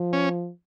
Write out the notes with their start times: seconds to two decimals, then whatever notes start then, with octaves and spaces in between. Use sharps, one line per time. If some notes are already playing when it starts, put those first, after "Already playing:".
Already playing: F3
0.13 C#4